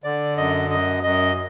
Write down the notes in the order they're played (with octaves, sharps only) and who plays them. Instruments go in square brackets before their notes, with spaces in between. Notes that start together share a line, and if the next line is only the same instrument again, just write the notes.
[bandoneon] D3 D5
F#2 D#5
F#2 D#5
F#2 D#5